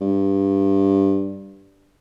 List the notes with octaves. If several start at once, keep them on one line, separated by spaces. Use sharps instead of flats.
G2